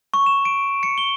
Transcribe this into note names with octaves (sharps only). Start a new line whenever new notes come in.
C#6
E7
D7
C#7
G7